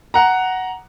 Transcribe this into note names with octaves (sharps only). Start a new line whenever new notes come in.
F#5 A#5